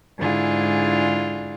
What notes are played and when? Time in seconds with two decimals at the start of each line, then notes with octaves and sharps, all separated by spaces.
0.18 G#2 D3 D4 E4 F4 G#4